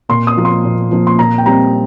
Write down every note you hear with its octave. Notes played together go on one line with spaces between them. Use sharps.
A#2 C6
D#6
F3 A#3
C6
A#2
F3 A#3
C6
A#2 A#5
G5
G3 C4 A#5